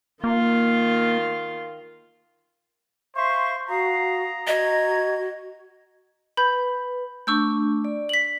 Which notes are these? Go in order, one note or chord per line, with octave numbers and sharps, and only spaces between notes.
D#3 A#3 F4
C5 E5 F5 C6 C#6
F#4 F5 A#5 D#6
F#4 D#5 G#6
B4 B5 G6
A3 D4 C#6 E6 G6
D5
B6 F#7